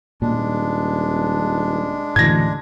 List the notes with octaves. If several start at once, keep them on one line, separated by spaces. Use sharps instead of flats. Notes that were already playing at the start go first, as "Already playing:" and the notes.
D#1 A#2 G#3 D4
D2 A2 C#3 E3 G#6 A#6